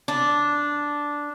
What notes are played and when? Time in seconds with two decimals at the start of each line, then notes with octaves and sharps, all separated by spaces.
0.08 D4